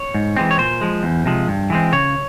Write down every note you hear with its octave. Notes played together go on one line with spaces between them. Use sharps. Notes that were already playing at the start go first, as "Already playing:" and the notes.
Already playing: C#5
G#2
E3 G#3 C4
C#5
A#2 C5
F3 G#3
E2
C3 F3 G#3
G2
E3 G#3 C4
C#3 C#5